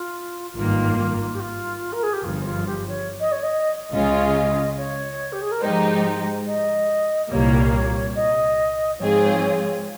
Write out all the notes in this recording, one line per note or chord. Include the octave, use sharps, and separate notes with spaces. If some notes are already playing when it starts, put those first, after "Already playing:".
Already playing: F4
G#1 G2 D#3 A#3 F4
G4
F4
A#4
G#4
G4
G1 G2 F3 F4
F4
G4
C#5
D#5
C#5
D#5
C#2 C#3 G#3 C#4 F4 D#5
C#5
G4
G#4
A#4
G#2 F3 G#3 D#4 G4 C5
D#5
C2 A#2 G3 A#3 C#5
D#5
G#2 F3 C4 F4 G#4 C#5